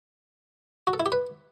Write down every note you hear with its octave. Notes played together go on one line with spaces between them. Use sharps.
F#4
A4
E4
G4
B4